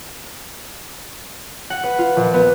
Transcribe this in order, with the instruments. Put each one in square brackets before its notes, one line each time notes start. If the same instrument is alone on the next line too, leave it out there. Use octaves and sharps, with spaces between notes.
[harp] F#5
B4
F4
A#1
B3